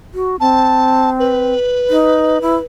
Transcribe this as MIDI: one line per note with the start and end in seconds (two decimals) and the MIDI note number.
0.14 0.36 66
0.40 1.54 60
0.40 1.10 81
1.19 2.64 71
1.90 2.38 63
2.42 2.56 64